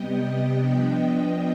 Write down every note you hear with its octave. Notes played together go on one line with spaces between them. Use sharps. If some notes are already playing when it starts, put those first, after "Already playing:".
Already playing: C3 G3 B3 D#5 G5
F3 B3 D4